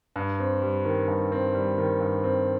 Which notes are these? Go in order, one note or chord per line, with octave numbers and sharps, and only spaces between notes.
G2
C4
G3
D#3
G2
C4
G3
D#3
G2
C4